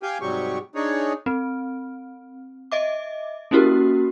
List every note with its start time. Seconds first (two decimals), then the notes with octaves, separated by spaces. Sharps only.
0.03 G4 F5 G5 G#5
0.21 G#2 C3 F#3 G3 G4 C#6
0.75 D4 D#4 G#4 C#5
1.26 C4
2.72 D#5 E5 D6
3.51 A#3 C#4 E4 F#4 G4 A#4